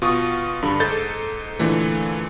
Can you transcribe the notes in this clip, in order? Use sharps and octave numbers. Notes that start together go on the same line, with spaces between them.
B2 F4 C#6 D#6
G2 D3 B5
G#2 D#4 A4 G6 A6
A#2 D3 E3 A3